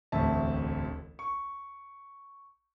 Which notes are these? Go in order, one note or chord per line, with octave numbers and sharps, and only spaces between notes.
E1 A1 D2 C4 E5 A5
C#6